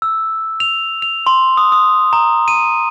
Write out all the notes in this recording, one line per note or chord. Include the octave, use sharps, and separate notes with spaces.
E6
F7
F7
C6
D#6
D#6
A#5
D#7